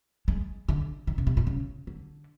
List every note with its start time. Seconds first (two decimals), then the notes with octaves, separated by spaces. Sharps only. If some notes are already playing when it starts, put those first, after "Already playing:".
0.28 G#3
0.69 D3
1.07 D#3
1.18 C#3
1.27 C3
1.37 A#2
1.47 C#3
1.87 D3